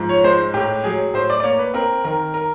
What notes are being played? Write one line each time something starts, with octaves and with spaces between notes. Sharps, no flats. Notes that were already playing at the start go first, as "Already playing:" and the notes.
Already playing: G#2 F3
C#5
G#3 C5
A2 G4
F#3 G#4
A2 C5
D5
D5
A#3 C#5
B4
C4 A#4
D#3 A#4
A#4